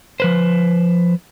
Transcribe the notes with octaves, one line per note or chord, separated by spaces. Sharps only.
F3 B4 C5